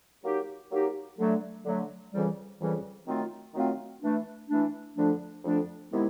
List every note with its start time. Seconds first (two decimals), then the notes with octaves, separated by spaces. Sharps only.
0.23 F#3 A#3 D#4 G4
0.71 F#3 A#3 D#4 G4
1.18 D3 F#3 A3
1.66 D3 F#3 A3
2.12 F2 C#3 E3 G3
2.60 F2 C#3 E3 G3
3.07 D#3 F#3 A3 C4 F4
3.54 D#3 F#3 A3 C4 F4
4.02 E3 A3 D4
4.49 E3 A3 D4
4.95 F2 D3 F3 A3 D4
5.44 F2 D3 F3 A3 D4
5.91 C3 D#3 G#3 B3 E4